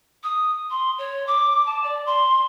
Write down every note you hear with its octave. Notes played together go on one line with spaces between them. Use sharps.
D#6
C6
C#5
D6
A5
D5
C6